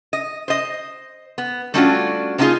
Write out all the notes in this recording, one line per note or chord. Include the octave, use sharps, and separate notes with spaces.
D#5
C5 D#5
B3
G3 A3 C#4 D4 F4 F#4
A#3 B3 D4 D#4 F4 G#4